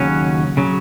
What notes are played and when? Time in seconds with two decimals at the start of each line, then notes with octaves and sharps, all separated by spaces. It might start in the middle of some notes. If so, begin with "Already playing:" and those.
Already playing: D#2 C#3 F#3 C#4
0.57 C#3 F#3